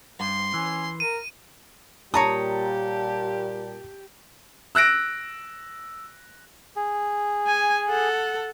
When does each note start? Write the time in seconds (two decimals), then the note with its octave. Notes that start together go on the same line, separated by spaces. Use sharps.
0.20 G2 C6
0.54 E3 C#4
1.00 A#4 D#7
2.14 A#2 G3 G4 C#5 A5 A#5 D#6
4.75 E6 F#6 A#6 D7
6.76 G#4
7.47 G#5
7.89 A4 F#5